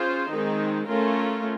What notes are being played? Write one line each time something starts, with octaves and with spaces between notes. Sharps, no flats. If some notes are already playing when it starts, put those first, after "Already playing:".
Already playing: C#4 F4 G#4 C5
D#3 G#3 C4 D#4
A3 C#4 F4 A#4